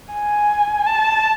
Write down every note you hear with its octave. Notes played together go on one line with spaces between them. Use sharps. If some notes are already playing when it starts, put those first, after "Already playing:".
G#5
A5